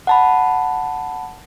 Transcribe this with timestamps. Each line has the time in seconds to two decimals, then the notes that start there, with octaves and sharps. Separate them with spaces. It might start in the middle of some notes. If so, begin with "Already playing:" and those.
0.07 F#5 A5 B5